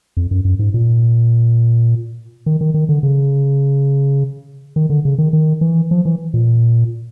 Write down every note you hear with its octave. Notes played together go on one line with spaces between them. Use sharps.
F2
F#2
F#2
G#2
A#2
D#3
D#3
D#3
D3
C#3
D#3
D3
C#3
D#3
D#3
E3
F3
E3
A#2